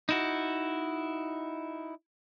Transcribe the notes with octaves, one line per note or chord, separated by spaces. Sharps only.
D#4 E4 F#4